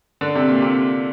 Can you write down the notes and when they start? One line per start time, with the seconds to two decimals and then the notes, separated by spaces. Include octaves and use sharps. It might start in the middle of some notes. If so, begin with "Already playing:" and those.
0.21 D3
0.35 C3
0.48 A#2
0.62 C3